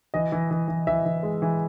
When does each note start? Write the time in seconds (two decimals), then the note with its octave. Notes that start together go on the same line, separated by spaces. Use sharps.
0.14 E3 D#5
0.32 E3
0.51 E3
0.68 E3
0.87 E3 E5
1.06 E3
1.23 G#3
1.42 E3